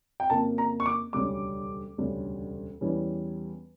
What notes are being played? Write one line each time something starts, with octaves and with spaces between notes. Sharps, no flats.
G5
F2 C#3 F3 A#3 A5
A#5
C#6
D6
E1 D2 C#3 G3 C#4 D6
E1 D2 C#3 G3 C#4
E2 E3 G3 C#4